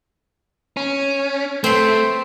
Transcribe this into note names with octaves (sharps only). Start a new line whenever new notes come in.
C#4
A3 C4 C6